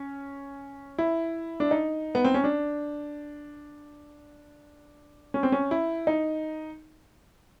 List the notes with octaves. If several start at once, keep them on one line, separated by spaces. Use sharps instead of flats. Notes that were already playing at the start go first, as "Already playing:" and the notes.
Already playing: C#4
E4
D4
D#4
B3
C4
C#4
D4
C#4
C4
C#4
E4
D#4